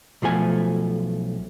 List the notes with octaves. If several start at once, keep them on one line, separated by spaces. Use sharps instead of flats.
B1 F3 A3 G#5